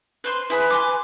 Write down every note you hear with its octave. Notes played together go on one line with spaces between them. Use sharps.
B4 C5 C6
E4 G#4 B4 B5
G#5 C6 D6